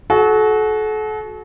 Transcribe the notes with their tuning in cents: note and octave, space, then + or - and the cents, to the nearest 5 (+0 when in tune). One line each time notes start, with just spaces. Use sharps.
F#4 +0 A4 -40